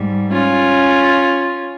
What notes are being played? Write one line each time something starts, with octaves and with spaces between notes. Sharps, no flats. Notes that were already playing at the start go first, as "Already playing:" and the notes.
Already playing: G#2 G3
C#4 F4